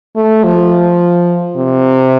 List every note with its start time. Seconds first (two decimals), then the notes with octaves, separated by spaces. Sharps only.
0.16 A3
0.44 F3
1.56 C3